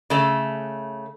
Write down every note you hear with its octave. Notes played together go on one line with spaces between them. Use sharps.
C#3 A3